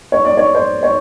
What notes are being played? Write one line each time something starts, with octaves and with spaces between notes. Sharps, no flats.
C#5
D5
C#5
C5
C#5